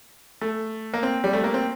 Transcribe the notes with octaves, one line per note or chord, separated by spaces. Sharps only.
A3
A#3
C4
G3
A3
A#3
C4